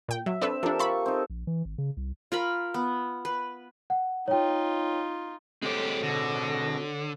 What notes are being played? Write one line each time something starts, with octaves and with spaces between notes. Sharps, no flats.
A#2 G5
F#3 E5
C4 D4 A4 B4 E5
F3 D4 G4 A4 A#4
F4 A5 B5 C#6
C4 D#4
A#1
E3
G#1
C#3
C2
F4 A#4 B5
B3
B4
F#5
D#4 F4 C#5 G5
G#3 C4 F#4 G4 A4 C5 C#5
B2 D3 A#6